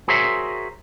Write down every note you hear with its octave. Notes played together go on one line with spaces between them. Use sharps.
F#4 G#4 A#4 C5 C#5 E5